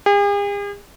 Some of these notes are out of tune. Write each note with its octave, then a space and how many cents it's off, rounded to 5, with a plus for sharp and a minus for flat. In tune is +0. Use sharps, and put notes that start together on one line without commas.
G#4 -45